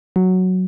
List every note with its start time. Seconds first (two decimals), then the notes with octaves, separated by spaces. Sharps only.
0.16 F#3